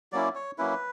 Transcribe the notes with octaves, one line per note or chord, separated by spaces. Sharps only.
F#3 A#3 C#4 E4 D5
C#5
F#3 A#3 C#4 E4 B4